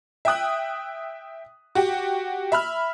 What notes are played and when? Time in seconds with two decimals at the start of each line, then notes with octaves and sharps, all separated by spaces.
0.25 E5 G5 D#6 F#6
1.75 F#4 G4
2.52 E5 B5 F6